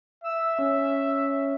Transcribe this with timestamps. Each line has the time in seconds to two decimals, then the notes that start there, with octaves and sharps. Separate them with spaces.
0.24 E5 E6
0.59 C#4